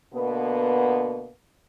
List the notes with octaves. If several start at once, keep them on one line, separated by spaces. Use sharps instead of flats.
B2 D3 A#3 B3